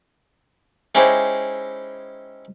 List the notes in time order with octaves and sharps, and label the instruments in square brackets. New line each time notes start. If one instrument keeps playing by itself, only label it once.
[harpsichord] G#3 C#4 D#4 E4 G4 C5